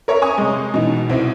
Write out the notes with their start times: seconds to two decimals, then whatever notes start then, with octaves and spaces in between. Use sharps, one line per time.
0.08 A#4 C#5 E5 A#5
0.22 G#5 C#6 D#6
0.38 C3 G#3
0.74 B2 E3 D#4
1.10 C2 C4 E4